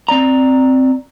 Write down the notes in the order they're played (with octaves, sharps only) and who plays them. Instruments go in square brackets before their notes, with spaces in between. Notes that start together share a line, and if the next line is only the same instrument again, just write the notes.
[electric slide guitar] C4 D5 A#5